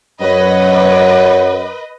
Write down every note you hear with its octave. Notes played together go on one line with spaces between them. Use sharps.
F#2 B4 C#5 D#5 F#5